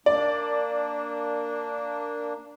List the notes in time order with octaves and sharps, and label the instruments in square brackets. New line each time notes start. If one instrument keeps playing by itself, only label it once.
[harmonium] A#3 D4 [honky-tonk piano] D5